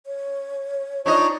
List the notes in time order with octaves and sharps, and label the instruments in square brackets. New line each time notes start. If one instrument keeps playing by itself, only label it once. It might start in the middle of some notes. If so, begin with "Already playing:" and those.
[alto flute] C#5
[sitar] D4 D#4 D#5 [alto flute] F4 [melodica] C#5